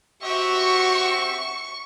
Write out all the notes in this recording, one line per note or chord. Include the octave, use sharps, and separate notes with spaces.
C4 F#4 G4 E5 C#6